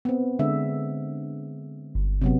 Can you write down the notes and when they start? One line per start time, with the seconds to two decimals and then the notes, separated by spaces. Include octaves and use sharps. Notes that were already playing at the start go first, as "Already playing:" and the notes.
0.05 B3 C4
0.39 D3 G#3 E5
1.95 G1
2.22 C3 F#3 B3